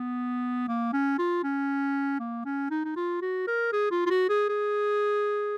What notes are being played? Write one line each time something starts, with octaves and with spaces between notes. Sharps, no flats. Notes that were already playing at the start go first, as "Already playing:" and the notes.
Already playing: B3
A#3
C#4
F4
C#4
A#3
C#4
D#4
D#4
F4
F#4
A#4
G#4
F4
F4
F#4
G#4
G#4